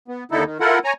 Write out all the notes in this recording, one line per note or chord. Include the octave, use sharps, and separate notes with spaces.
B3
D#2 D3 D#4 E4 A4
D#3
E4 F4 A4 A#4 F#5
C#5 G#5 A#5